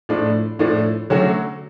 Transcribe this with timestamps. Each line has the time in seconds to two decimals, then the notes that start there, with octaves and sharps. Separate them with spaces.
0.09 A2 F3 A3 D4
0.59 A2 F3 A3 D4
1.10 D3 F#3 A3 C#4 F#4